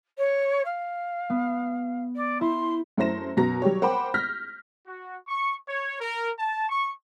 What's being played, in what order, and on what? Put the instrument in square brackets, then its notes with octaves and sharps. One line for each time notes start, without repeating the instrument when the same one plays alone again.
[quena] C#5
F5
[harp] B3
[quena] D5
[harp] E4 [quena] C6
[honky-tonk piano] F#2 A3 E4 C5 A#6 E7
F#2 B2 F#4 A#5 A#6
F#3 G3 G4 C#5
A#4 C5 F#5 G5 B5 D6
F6 G6 A#6 B6
[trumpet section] F#4
C#6
C#5
A#4
A5
C#6